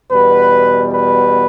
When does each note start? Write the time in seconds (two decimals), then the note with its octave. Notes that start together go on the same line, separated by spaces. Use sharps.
0.11 E2 B2 G3 B3 B4
0.94 B4